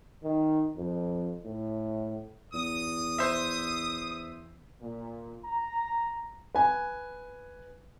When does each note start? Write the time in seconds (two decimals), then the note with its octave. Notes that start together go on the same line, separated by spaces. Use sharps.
0.24 D#3
0.77 F2
1.45 A2
2.54 E2 D#6
3.18 C5 E5
4.81 A#2
5.44 A#5
6.55 B4 G#5